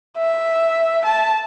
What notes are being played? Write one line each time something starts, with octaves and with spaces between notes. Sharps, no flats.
E5
A5